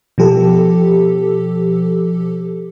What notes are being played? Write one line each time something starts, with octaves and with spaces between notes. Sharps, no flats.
B2 F3 G4 A4